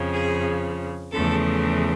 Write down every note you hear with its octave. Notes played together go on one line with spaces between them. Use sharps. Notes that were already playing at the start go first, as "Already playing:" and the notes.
Already playing: F2 C#3 F3
G#4
E2 C#3 F3 A3 A4